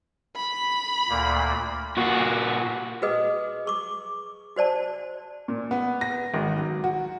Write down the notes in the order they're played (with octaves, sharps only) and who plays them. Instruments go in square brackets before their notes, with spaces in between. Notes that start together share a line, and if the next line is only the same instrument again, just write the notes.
[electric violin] B5
[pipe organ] D2 A#2 A#3
[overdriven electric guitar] A#2 F#4
[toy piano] F#4 G#4 B4 D#5 D#6
G#4 C#6 D6
F#4 C5 D5 A5
[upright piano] A#2
B3
A#6
G#1
F#3
F#4